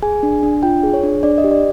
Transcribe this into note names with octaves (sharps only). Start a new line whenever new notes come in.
G#4 G#5
D4
D4
F4 G5
G#4
C#5
D4
D4 D5
D#5
G4
D5